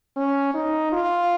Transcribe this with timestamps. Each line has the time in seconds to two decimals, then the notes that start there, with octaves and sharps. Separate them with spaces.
0.17 C#4
0.54 D#4
0.92 F4